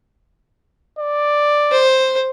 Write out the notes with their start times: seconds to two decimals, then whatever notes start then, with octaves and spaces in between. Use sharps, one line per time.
0.99 D5
1.71 C5